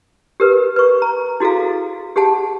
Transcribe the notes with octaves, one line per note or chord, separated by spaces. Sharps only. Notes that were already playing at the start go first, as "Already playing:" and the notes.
G4 A#4 B4
B4 C#6
A#5
E4 F#4 G#4 A4 F5
G4 G#4 F#5 A5